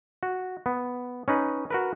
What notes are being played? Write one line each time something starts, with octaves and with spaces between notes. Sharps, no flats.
F#4
B3
C#4 D#4 B4
F#4 A#4 B4